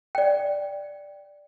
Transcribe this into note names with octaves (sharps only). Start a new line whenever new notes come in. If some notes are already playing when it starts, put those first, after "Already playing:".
D5 G5